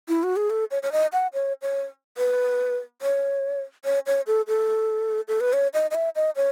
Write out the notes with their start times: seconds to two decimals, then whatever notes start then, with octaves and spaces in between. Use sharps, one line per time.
0.09 E4
0.23 F#4
0.36 G#4
0.50 A4
0.71 C#5
0.83 C#5
0.92 D#5
1.13 F#5
1.33 C#5
1.62 C#5
2.18 B4
3.02 C#5
3.85 C#5
4.06 C#5
4.27 A4
4.48 A4
5.28 A4
5.41 B4
5.53 C#5
5.74 D#5
5.91 D#5
5.95 E5
6.16 D#5
6.36 C#5